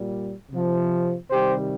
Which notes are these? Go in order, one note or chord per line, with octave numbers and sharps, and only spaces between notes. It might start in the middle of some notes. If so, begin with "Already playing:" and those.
Already playing: A#2 G3
C3 F3
C3 D#3 G3 G4 C5